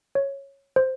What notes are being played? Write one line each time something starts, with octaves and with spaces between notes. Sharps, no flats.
C#5
C5